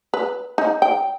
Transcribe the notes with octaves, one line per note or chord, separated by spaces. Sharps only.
B4
D#4
G5